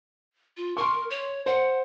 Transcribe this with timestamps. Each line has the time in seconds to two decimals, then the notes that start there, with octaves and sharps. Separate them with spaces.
0.57 F4
0.77 A#4 C6 C#6
1.10 C#5
1.46 C5 F#5